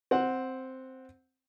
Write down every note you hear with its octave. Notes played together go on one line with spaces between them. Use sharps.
C4 F#5